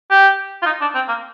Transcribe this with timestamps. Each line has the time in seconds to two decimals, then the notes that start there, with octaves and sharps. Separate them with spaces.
0.11 G4
0.63 F4
0.66 D#4
0.81 D4
0.95 C4
1.08 A#3